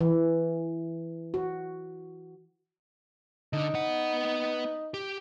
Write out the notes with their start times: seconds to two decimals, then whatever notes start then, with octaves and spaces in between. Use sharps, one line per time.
0.01 E3
1.34 F#4
3.53 D3 D4 D#4
3.75 B3 F#5
4.94 G4